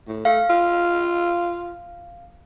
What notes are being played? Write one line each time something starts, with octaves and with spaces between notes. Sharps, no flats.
A2
A3 F5
F4